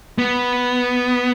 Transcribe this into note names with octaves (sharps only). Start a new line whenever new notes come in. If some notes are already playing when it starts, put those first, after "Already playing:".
B3